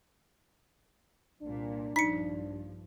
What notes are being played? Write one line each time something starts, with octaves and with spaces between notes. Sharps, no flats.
C2 A#2 D4
A#1 G2 F3 D#4 B6 C#7